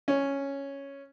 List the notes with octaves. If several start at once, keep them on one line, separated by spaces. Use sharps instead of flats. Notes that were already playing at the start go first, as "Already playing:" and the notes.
C#4